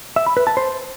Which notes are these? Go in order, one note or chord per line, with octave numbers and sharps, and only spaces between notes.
E5
B5
B4
A5
C5